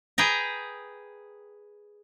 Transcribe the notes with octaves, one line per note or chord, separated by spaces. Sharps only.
G#4 B4 G5 A#5